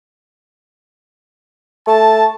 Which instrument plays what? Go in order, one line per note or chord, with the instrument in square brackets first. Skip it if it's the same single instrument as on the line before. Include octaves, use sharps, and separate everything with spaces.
[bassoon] A3 [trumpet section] A5